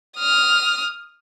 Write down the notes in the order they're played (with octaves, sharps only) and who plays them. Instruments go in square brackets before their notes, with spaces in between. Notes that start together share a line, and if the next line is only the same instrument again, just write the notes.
[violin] D#6 F6